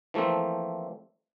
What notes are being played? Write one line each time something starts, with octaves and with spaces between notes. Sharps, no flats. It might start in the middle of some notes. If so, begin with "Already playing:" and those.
E3 F3 A3 A#3 C4